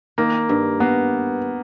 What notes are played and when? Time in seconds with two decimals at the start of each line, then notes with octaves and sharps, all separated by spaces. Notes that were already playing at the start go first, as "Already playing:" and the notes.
0.18 D#3 A#3
0.49 G2
0.80 A#3 B3